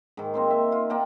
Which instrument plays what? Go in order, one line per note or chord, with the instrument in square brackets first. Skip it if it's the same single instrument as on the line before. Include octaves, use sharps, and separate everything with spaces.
[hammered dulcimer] G#2 D#3
A#3 C4 C6
E5
F4
A#3 F#5 G5 A5